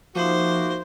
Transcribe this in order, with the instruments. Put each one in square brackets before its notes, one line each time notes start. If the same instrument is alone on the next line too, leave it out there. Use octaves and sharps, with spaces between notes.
[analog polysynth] F3 [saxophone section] A#3 F#4 [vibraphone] D#4 E5 D6 [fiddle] C5